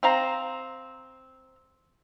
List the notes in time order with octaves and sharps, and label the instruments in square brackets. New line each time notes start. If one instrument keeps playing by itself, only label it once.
[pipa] C4 F5 A#5